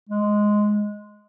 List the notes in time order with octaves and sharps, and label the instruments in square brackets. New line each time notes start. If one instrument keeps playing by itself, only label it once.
[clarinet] G#3